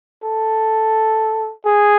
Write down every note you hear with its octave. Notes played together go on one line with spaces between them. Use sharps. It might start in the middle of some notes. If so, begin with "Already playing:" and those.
A4
G#4